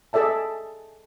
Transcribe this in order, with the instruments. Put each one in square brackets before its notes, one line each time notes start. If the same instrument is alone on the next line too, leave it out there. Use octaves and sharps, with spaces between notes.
[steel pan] G#4 A4 D5 E5 A5